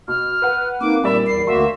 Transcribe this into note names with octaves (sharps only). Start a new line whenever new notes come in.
B2 F6
B4 F#5
A#3 C4 D#4 D6
A#2 G3 A#4 D5 E5 B5
E2 C7
D2 A#3 F#4 E5 C6